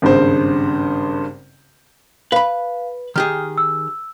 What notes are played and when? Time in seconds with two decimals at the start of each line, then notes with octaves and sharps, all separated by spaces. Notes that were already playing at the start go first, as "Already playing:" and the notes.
0.02 G#1 G2 C#3 C5
2.32 B4 F5 B5
3.16 D#3 G4 G#4 F6
3.58 E6